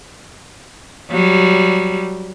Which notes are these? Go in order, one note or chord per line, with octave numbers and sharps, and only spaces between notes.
F#3 G3